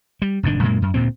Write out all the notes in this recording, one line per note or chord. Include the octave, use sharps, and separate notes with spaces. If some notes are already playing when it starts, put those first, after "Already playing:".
G3
F1 G#2 D#3 D4
F#2 A#2 G#3 A#3
F#2
D2 A#2 C4